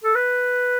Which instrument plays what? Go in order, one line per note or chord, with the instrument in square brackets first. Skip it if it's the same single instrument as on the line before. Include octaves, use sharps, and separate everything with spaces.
[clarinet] A4
B4